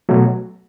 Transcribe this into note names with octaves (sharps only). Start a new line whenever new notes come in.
B2 F#3 A3